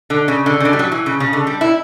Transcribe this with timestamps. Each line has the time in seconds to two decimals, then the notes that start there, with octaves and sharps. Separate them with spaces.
0.10 D3
0.28 C#3
0.46 D3
0.60 C#3
0.65 D3
0.73 G3
0.79 F#3
0.92 E3
1.06 C#3
1.20 C#3
1.33 D3
1.47 G3
1.61 E4